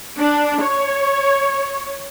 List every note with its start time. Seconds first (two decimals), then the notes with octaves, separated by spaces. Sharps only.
0.19 D4
0.62 C#5